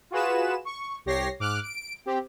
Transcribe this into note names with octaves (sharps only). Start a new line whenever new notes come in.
F4 F#4 G#4 B4 E7
C#6
C2 G4 C#5 A#6 C7
G#2 D6 F6 F#6
D7
C4 G4